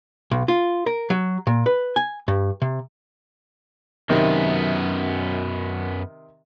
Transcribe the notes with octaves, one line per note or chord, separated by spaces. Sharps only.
B1
F4
A#4
F#3
A#2
B4
G#5
G2
C3
F#2 C3 D#3 B3